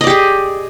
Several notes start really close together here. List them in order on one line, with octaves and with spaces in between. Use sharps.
D#5 D5 G4 G#4